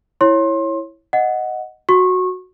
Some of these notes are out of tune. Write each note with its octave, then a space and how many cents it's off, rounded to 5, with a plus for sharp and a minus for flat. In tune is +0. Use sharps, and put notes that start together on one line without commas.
E4 +0 C#5 -15 C6 +25
D#5 +0 F#5 +0
F#4 -5 C#6 -25